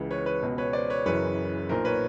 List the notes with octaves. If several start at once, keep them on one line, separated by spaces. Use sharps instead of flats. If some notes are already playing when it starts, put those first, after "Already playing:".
Already playing: C#2 C#3 E3
B4 C#5
B4 C#5
C#2 B2
B4 C#5
C5 D5
B4 C#5
F#1 F#2 C#3 E3 B4 C#5
B1 A#2 A#4 C5
B4 C#5